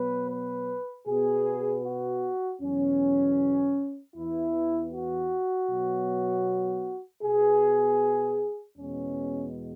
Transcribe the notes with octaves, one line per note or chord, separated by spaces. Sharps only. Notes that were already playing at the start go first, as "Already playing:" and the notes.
Already playing: B2 F#3 B3 B4
B4
B2 B3 G#4
F#4
E2 B2 F#3 C#4
E2 E3 B3 E4
F#4
B2 F#3 B3
B2 B3 G#4
E2 B2 G#3 B3 C#4